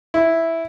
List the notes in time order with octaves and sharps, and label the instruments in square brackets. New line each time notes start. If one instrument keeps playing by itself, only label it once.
[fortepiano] E4